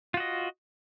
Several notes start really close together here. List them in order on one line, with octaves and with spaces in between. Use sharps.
F4 F#4 D#5